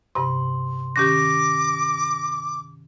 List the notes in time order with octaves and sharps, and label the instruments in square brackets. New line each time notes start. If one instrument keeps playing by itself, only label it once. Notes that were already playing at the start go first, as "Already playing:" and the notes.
[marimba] G2 C3 [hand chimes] C6
[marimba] D#3 C#4 G4 [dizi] D6 [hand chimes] A#6